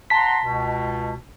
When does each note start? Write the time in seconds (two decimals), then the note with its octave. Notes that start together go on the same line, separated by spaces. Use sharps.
0.10 F#5 A5 A#5 C6 B6
0.43 C#2 B2